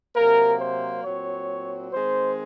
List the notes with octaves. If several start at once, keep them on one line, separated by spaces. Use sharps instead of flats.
C3 F#3 A#3 A#4
C5
A#2 F#3 C4 C#5
D#3 G#3 C4 C5